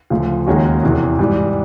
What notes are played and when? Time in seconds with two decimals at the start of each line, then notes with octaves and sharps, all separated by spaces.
0.10 D2 C#3 F3
0.46 D#2 D#3 G#3 C#4 F#4
0.83 E2 C3 E3
1.19 G#2 E3 G3